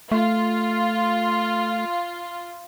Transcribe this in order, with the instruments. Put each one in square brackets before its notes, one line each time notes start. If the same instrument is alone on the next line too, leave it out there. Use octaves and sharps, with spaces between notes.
[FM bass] A3 [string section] F4